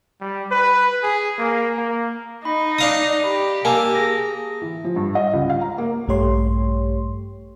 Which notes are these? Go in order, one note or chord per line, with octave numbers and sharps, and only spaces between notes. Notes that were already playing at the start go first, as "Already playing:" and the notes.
G3
B4
G#4
A#3
A#3
D#4 B5
D4 F5 D#6 A#6
G4 B5
A#3 G#5 A5 E6
G#4 A#6
E3
F3
G2
D#5
C#2
F5
A#5
A#3
A#1 G2 A3 G4 C#5 C6